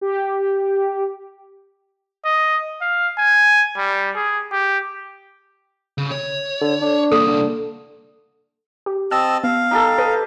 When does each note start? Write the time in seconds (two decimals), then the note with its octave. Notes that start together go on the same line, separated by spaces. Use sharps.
0.01 G4
2.25 D#5
2.81 F5
3.18 G#5
3.77 G3
4.16 G#4
4.52 G4
5.98 C#3
6.11 C#5
6.61 D3
6.81 D4
7.12 C2 A#3 A4
7.27 D3
8.86 G4
9.11 C4 D#5 A5 E6
9.44 B3 F5
9.71 D#4 G4 A4
9.98 A4 B4 D#5